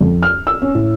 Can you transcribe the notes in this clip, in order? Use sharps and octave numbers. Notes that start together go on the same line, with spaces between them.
F2
F6
E6
C#4
A2